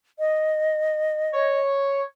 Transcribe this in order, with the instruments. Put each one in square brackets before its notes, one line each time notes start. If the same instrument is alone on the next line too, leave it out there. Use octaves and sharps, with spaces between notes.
[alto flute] D#5
[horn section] C#5